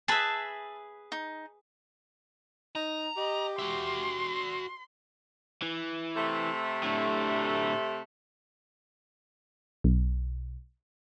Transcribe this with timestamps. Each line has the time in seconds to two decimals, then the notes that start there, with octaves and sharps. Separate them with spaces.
0.08 G#4 B4 E5 A5 B5
1.12 D#4
2.75 D#4 A#5
3.17 G4 D#5
3.59 F#4 E5 C6
5.62 E3
6.16 C3 A3
6.83 A2 D3
9.84 B1